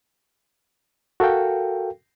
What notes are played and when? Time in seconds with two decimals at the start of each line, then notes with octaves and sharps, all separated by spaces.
1.20 F#4 A4 A#4 F5 G5